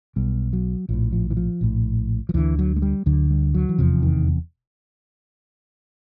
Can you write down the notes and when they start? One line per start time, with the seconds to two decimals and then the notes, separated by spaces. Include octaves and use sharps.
0.16 B1 B2 G3
0.53 F#3
0.89 A#1 A2 F3
1.12 F3
1.30 E3
1.37 F3
1.61 A#1 A2
2.29 F3
2.34 D2 D3 E3
2.59 F#3
2.76 G#3
2.82 G3
3.06 D2 D3 F#3
3.30 G3
3.55 F#3
3.69 E3
3.78 F1 E2 C3 F3
4.03 D#3